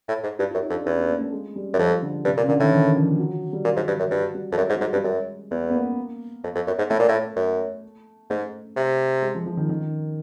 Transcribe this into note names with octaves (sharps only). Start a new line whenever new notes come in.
A2
G#2
G2 G4
F#2 F4
D#4
F2
D4
E2 C#4
B3
A#3
A3
G#3
G3
F#2
F2 F3
D3
G2 C3
A#2
C#3
A#2 D3
A2 D#3
E3
F3
F#3
G3
A#2 F#3
G#2
G2
F#2
G2 F#3
G3
F2
F#2 G#3
G#2
F#3
G#2 G3
G2 G3
F#2 G#3
E2 B3
B3
A#3
F2
F2
F#2
G#2
A2 A3
A#2
A2
F#2
G#2 A3
C3
G#3
F3
F3
D#3
D#3